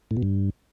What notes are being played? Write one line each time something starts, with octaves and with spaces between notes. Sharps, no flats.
A2
B2
G2